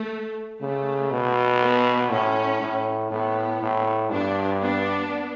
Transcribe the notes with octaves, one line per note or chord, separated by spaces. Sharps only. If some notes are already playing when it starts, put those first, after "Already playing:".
Already playing: A3
C#3 A3
B2
B3
A2 C#4
A2
A2 B3
A2
G2 B3 D4
B3 D4